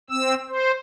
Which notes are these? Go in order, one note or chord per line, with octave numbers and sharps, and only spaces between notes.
C4 E6
C5